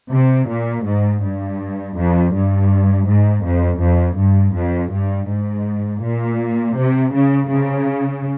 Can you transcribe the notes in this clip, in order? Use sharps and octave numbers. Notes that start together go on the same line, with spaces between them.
C3
A#2
G#2
G2
F2
G2
G#2
F2
F2
G2
F2
G2
G#2
A#2
C3
C#3
C#3